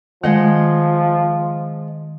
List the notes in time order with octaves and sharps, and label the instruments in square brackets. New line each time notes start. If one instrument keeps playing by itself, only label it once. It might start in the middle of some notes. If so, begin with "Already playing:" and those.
[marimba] D#3 [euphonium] F3 [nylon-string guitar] G#3 D#5 F#5